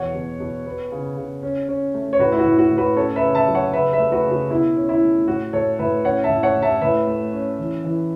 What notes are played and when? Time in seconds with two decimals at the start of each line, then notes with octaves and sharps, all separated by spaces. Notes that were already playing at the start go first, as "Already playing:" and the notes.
Already playing: E2 B2 C#5 F#5
0.14 B2
0.40 B2
0.66 B3
0.92 C#3
1.17 C#3
1.43 C#4
1.68 C#4
1.94 A3
2.13 C#5
2.19 A2 F#4 B4
2.32 E4
2.39 F#4
2.45 A2
2.58 F#4
2.71 A2
2.77 F#4 B4
2.96 C#4 A4 C#5
3.16 B4 E5
3.22 C#3
3.35 E5 A5
3.48 F#3
3.55 C#5 F#5
3.73 C#3 B4 E5
3.92 B4 E5
3.99 A3
4.12 F#4 B4
4.25 C#3
4.31 F#4
4.50 B2 E4
4.76 C#4
4.89 E4
5.02 A3
5.28 A2 F#4
5.53 A2 A4 C#5
5.79 A2 B4 E5
6.05 C#4 C#5 F#5
6.24 E5 A5
6.30 A2
6.43 C#5 F#5
6.56 A2
6.62 E5 A5
6.81 A2 B4 E5
7.07 A3
7.33 C#4
7.59 E3
7.84 E3